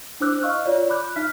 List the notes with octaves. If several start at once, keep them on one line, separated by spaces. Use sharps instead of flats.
D4 E4 C5 D6 E6 F#6
D#5 F5 C#6 E6 F6
F4 C#5 D5
B5 D6 F#6 G6
D#4 E5 F6 B6